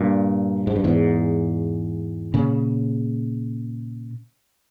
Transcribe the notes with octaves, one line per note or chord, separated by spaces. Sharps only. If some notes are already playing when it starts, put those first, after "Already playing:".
Already playing: G2 A#2
G#2
G2
E2 G#2
A#2 C#3